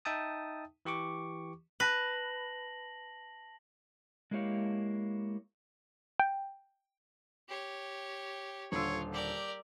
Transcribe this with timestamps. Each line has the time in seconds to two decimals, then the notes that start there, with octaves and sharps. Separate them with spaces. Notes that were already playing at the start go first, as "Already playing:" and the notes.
0.05 D#4 E5 G5 A5 D#6
0.85 E3 G4 C#6 D6
1.80 B4 A5 A#6 F#7
4.31 G#3 A#3 E4 G4 C#5 F5
6.19 G5
7.48 G4 C#5
8.72 D#1 D3 F4 C#5 E6
9.13 G4 A#4 D5